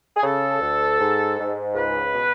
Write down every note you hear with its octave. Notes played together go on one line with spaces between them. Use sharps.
G#4
C#3 A4
D2
G#2
G#2
C#2 B4
B2